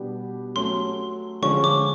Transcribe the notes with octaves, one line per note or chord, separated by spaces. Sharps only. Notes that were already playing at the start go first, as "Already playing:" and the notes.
Already playing: B2 G3 B3 D4 G4
F#3 A3 C#4 C6
D3 F3 G#3 C#4 C#6
D6